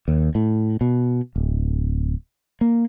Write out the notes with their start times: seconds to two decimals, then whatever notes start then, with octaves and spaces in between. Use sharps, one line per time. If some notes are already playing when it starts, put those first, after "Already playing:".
0.08 D#2
0.35 A2
0.81 B2
1.36 D1
2.61 A#3